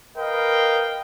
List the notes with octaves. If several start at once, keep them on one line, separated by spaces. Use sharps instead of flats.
A#4 B4 D#5 F5 G5